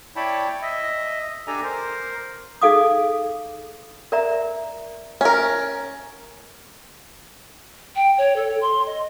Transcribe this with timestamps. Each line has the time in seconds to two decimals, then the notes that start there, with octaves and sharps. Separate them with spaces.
0.16 E4 C#5 D5 G5 A5 B5
0.62 D#5 E5
1.47 D4 G4 A4 D5 G#5 A#5
1.63 A#4 C5
2.62 D#4 G#4 A4 F5 D6 D#6
4.12 A#4 D5 E5 A#5
5.21 C#4 A#4
7.96 G5
8.18 C#5
8.36 A4
8.61 C6
8.86 D#5